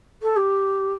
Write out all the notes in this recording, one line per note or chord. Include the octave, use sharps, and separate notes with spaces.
A4
G4